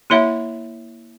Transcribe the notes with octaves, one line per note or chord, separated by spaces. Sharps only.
A#3 E4 C#5 E5 F#5 B5